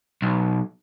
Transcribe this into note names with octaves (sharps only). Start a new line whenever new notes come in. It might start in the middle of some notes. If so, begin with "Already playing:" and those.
B1